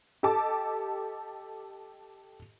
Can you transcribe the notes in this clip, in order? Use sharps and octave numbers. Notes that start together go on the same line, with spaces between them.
G4 A4 D#5 A5 D6